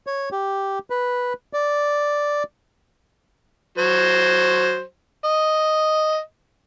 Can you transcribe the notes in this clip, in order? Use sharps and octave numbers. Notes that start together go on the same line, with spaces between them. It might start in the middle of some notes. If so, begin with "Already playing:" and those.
C#5
G4
B4
D5
F#3 C5
D#5